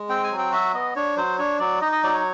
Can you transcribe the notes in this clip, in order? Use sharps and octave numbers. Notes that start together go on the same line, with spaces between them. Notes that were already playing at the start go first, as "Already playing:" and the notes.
Already playing: G#3
C4 G5
G#5
F#3
G5
F#4 E5
B3 D#5
D4 C#5
F#3 C5
D4 C#5
F#3 D5
D#4 D#5
D#5
F#3 D5
C#5